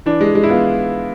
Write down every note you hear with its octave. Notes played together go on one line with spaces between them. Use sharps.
E3 D4
G#3
G#3
E4
B3 F4